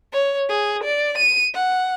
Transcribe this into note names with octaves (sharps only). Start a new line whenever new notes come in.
C#5
G#4
D5
D#7
F#5